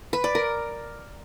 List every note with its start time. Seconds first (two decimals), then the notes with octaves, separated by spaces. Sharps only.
0.13 B4
0.24 D5
0.35 A#4